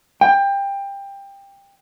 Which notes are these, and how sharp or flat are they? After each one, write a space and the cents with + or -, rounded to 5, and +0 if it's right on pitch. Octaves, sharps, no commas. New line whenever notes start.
G5 +20